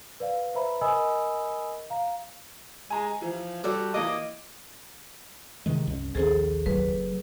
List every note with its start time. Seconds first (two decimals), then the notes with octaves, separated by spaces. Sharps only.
0.20 B4 D5 F5
0.55 B4 C5 E5 A#5 B5
0.81 A#4 D#5 G#5 B5 D#6 E6
1.90 F5 A#5
2.90 G#3 G#5 A#5
3.22 E3 F3
3.64 G3 F#4 A4 D5
3.94 E3 A#3 D#5 D6
5.66 C3 D#3 G#3
5.87 C2 F#2
6.15 A#1 D#2 C4 G#4 A4 C5
6.66 F#1 F#3 B4